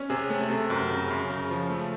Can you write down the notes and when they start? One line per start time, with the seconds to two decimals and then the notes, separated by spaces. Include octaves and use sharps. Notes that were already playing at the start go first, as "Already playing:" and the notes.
Already playing: C#4
0.10 C3 G#4
0.30 A3
0.50 C3
0.70 F#2
0.90 C#3
1.10 F#2
1.30 C#3
1.50 F3
1.70 A3